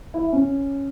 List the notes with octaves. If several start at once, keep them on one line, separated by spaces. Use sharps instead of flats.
E4
C#4